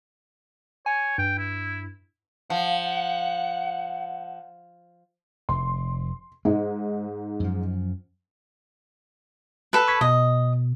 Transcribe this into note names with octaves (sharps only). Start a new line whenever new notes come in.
C#5 G#5
G2 G5
E4
F3 F#5
F1 C6
G#2 G#3 D#4
F#2 F3
A4 B4
C#6 G#6 B6
B2 D#5